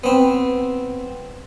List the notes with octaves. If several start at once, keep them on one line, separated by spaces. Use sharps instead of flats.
B3 C4